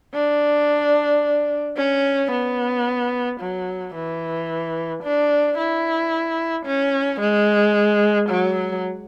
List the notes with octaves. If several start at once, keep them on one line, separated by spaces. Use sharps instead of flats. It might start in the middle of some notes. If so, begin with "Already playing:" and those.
D4
C#4
B3
F#3
E3
D4
E4
C#4
G#3
F#3